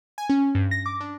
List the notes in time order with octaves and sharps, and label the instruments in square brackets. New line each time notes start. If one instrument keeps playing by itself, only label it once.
[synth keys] G#5
C#4
G2
A#6
D6
D4